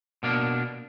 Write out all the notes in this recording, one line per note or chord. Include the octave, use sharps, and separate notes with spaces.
B2 A#3 D4